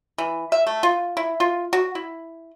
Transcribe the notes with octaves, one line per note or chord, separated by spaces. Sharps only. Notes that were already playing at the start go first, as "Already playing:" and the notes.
E3
E5
A3
F4
E4
F4
F#4
E4